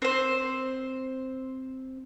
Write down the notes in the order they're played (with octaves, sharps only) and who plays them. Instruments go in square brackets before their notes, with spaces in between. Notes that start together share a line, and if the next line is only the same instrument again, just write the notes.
[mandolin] C4 C5